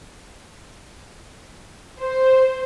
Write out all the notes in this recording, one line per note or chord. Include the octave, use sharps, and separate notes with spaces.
C5